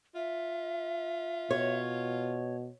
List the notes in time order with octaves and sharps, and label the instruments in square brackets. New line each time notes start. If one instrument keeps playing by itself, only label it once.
[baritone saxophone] F4 [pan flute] E5
[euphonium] B2 [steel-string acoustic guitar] C#5